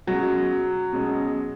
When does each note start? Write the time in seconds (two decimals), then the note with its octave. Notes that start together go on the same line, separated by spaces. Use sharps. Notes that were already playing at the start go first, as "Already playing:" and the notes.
0.07 B2 F#3 G#3 C#4
0.93 B2 G#3 C#4